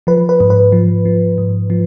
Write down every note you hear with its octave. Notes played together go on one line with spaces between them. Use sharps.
F3 B4
B4
G#2
B4
F3
F3
G#2
F3